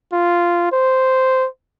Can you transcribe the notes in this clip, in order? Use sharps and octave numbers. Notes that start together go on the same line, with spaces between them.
F4
C5